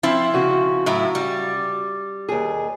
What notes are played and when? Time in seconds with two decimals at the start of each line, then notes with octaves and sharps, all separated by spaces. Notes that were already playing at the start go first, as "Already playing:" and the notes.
0.03 F3 C4 E4
0.34 C#3 F#4
0.86 A2 F#3 E4
1.15 G3
2.29 D#2 G#4